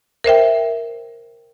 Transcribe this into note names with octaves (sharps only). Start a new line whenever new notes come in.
A#4 C5 E5 G5